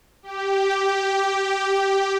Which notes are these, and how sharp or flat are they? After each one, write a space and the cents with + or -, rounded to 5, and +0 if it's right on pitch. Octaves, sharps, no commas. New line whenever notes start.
G4 -5